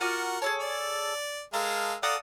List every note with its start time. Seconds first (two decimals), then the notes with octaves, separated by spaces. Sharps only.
0.01 F4 F#4 A#4 F#5 D6
0.42 G#4 A4 C#5 A5
0.60 D5
1.54 G#3 A4 A#4 F5
2.03 A4 D5 F5 F#5 A#5 D#6